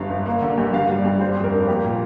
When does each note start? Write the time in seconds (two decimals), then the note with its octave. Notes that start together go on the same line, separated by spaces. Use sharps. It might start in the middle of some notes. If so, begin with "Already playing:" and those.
Already playing: G1 G2 F5
0.10 G1
0.26 A#3
0.41 D3
0.58 G2
0.73 G2 F5
0.89 G3
0.97 D5
1.05 G2
1.20 G3 C5
1.36 F2
1.44 A#4
1.52 F1
1.67 A#3 G4
1.84 A#2